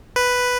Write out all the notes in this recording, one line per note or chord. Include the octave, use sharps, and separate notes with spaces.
B4